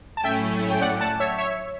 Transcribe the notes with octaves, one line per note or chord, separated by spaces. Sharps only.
A5
A2 F#3 A3 C#4 E4 E5 G5
G5
D5 F#5
F#5 A5
C#5 E5
C#5 E5